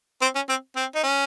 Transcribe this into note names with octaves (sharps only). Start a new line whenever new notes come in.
C4 C5
C#4
C4
C4
D#4
C#4